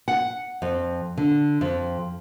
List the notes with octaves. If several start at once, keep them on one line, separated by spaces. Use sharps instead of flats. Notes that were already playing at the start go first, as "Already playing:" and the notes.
F#5
F2
D3
F2